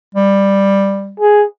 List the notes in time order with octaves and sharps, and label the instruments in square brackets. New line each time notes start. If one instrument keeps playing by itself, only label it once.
[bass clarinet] G3
[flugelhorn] G#4